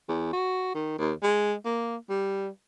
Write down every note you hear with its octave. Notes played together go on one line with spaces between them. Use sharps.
E2
F#4
D#3
D#2
G#3
A#3
G3